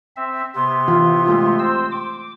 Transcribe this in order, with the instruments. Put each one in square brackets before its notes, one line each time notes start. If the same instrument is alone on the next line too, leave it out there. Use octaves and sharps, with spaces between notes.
[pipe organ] C4 E5
[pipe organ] C3 B3 [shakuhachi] C6
[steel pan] E3 F4
G#3 A3 F4
[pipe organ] C4 C5 E6
D6